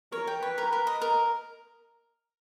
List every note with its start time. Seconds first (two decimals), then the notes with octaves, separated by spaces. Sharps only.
0.12 A#4 C#5
0.27 G5
0.42 B4 C#5
0.58 A#4
0.73 A#4
0.87 D#5
1.02 A#4